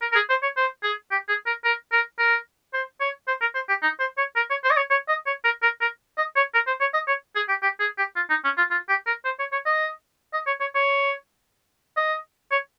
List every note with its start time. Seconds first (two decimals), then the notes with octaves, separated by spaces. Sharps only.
0.02 A#4
0.12 A#4
0.15 G#4
0.30 C5
0.42 C#5
0.57 C5
0.83 G#4
1.11 G4
1.28 G#4
1.47 A#4
1.64 A#4
1.92 A#4
2.19 A#4
2.74 C5
3.01 C#5
3.28 C5
3.41 A#4
3.55 C5
3.69 G4
3.83 D#4
4.00 C5
4.18 C#5
4.36 A#4
4.50 C#5
4.64 C5
4.71 D#5
4.77 C#5
4.91 C#5
5.08 D#5
5.26 C#5
5.44 A#4
5.63 A#4
5.81 A#4
6.18 D#5
6.36 C#5
6.54 A#4
6.67 C5
6.81 C#5
6.94 D#5
7.08 C#5
7.36 G#4
7.49 G4
7.63 G4
7.80 G#4
7.98 G4
8.16 F4
8.30 D#4
8.44 C#4
8.58 F4
8.71 F4
8.89 G4
9.07 A#4
9.25 C5
9.39 C#5
9.52 C#5
9.66 D#5
10.34 D#5
10.47 C#5
10.60 C#5
10.75 C#5
11.97 D#5
12.52 C#5